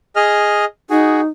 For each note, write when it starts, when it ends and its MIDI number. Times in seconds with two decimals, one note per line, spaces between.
0.16 0.65 68
0.16 0.65 75
0.16 0.65 89
0.90 1.26 63
0.90 1.21 66
0.90 1.21 68